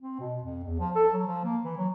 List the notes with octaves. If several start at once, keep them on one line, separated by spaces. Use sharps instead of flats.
C4
B2
F2
E2
F3
A4
F#3
F3
A#3
E3
F#3